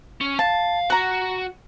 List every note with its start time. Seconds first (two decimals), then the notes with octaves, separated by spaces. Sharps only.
0.21 C#4
0.39 F5 A5
0.90 F#4 F#5 A#5